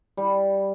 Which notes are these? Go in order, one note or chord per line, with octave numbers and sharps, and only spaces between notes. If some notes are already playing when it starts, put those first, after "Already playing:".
G3